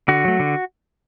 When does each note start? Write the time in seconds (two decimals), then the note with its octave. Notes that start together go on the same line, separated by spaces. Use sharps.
0.08 D3 F#4
0.24 F#3 A3
0.40 D3